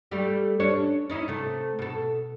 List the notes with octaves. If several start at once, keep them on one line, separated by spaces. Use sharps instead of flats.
G3 A3 G4
C#4 D4 C#5
C#4 D#4 E4
C3 A3
B2 A4